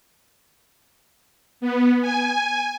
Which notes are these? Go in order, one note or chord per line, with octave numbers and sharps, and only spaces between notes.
B3
G#5